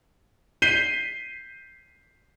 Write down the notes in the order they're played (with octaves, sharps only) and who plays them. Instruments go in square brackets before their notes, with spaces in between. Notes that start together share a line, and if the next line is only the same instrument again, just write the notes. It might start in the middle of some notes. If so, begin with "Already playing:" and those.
[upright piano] G6 B6 C7 D#7 G7